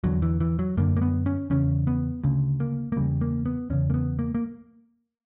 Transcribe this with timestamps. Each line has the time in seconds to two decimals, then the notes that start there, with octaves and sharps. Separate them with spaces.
0.04 E2 D3 F#3
0.22 E3
0.41 E3
0.59 F#3
0.77 F#2 D3 A#3
0.97 A#3
1.02 B3
1.26 C#4
1.50 E2 C#3 C#4
1.87 B3
2.24 D2 C#3
2.60 A#3
2.92 A#3
2.96 E2 C#3 G3
3.21 A#3
3.46 B3
3.70 E2 C#3 C#4
3.90 A#3
3.94 B3
4.19 A#3
4.35 A#3